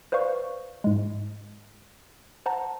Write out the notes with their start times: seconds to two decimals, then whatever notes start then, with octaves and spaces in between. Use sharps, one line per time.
0.12 B4 C5 D5 F5 C#6
0.84 G#2 G#3
2.46 C5 F#5 A5 A#5